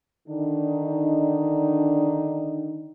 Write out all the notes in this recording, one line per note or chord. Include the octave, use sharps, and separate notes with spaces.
D3 D#3 D4 D#4